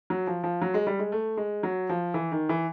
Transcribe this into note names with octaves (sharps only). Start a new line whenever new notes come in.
F#3
F3
F3
F#3
G#3
G3
G#3
A3
G#3
F#3
F3
E3
D#3
E3